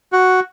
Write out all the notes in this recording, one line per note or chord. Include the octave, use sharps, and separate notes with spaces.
F#4